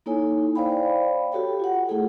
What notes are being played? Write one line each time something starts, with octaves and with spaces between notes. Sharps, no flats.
A#3 D#4 E4 A4 C#5 G#5
C5 D5 F5 G5 B5
F#4 G4 A4 C#5 G5
F4 F#5
A3 E4 F4 G#4 A4